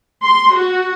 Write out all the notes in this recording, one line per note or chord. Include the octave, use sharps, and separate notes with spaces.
C6
F#4